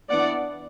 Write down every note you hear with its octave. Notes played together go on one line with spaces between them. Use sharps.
E3 B3 D4 D5 F#5